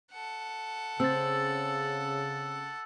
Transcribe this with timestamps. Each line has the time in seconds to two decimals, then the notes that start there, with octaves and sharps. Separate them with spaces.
0.12 A4 F#5
1.00 C#3 C4 E6 A6